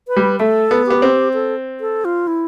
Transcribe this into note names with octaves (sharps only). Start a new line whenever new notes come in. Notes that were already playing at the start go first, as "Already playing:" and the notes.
B4
G3
A3 A4
B3
B3 G4
C4
A4
A4
F4
E4